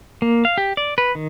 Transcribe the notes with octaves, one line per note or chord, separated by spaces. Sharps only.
A#3
F5
G4
D5
B4
D#3